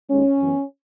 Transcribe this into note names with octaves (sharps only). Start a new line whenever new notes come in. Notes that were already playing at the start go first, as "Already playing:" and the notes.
D#2 D#3 G#3 C#4
F#2 E3 B3